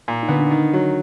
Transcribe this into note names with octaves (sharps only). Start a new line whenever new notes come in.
A#2
D#4
D3 B3 D4
D3 D4
D#3
F#3